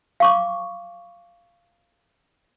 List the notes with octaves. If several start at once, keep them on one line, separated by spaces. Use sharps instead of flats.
F5 C#6 D6